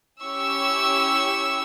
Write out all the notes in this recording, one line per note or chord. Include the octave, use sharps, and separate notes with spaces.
C#4 E4 G4 C#6 E6